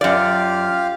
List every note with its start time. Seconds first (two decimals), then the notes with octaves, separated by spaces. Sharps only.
0.01 F#2 F4 G4 D5 F5